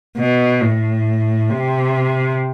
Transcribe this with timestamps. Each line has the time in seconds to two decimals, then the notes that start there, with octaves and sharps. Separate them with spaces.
0.18 B2
0.61 A2
1.50 C3